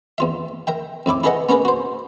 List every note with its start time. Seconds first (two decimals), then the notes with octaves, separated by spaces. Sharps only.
0.18 E2 F4 E5
0.67 A#4 E5 G5
1.06 F2 A2 E4 D6
1.24 E4 G#4 A4 B4 D#5 F#5
1.49 B3 C#4 G#4 A#4 B4
1.65 F#4 C5